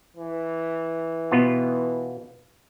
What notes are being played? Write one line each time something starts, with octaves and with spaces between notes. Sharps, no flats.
E3
B2 B3 F4